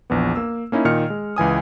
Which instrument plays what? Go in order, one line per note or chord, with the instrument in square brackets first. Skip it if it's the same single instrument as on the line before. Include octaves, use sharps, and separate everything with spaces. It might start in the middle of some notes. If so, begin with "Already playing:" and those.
[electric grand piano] A#1 E2 B3
A#3 E6
A#3 C#4 D#4 E4
A#2 D#3 D#5 F6 C#7
G#3
C#2 E3 G#5 D#6